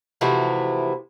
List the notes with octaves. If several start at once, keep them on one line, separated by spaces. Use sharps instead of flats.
C3 E3 F3 A3 E4 F#4